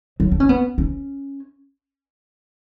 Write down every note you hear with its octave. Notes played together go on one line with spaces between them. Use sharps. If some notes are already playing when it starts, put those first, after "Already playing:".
F#3
D4
C#4
B3
C#4